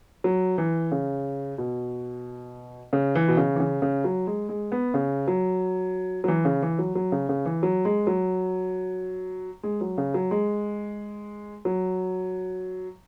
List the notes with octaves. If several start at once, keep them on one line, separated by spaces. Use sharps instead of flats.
F#3
E3
C#3
B2
C#3
E3
B2
C#3
E3
C#3
C#3
F#3
G#3
G#3
B3
C#3
F#3
F#3
E3
C#3
E3
F#3
F#3
C#3
C#3
E3
F#3
G#3
F#3
G#3
F#3
C#3
F#3
G#3
F#3